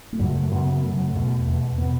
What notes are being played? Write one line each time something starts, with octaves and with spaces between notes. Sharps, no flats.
A3
F#2 C#3 F#3
A3
A3
F#2 C#3 B3
B3
F#2 C#3 A3
F#3
A3
E2 B2
E2 B2
B2 B3